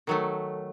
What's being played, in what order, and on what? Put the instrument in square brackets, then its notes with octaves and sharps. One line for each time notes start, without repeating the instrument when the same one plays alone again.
[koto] D#3 F#3 A3